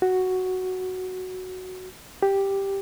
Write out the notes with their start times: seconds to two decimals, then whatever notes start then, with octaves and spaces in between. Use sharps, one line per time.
0.02 F#4
2.23 G4